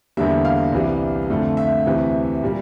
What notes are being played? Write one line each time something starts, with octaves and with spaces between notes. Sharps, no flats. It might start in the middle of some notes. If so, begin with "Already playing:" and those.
E2 D3 G3 A#3 E5
F5
C2 C3 E3 G3
F2 D3 A3
E5
D2 C3 E3
A#2 G3 A#3